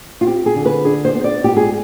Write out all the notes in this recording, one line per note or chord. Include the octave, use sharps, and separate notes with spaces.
F4
C4 G4
G#4
D3
B4
D4 G#4
C5
B3
D5
G#2 G4
G#4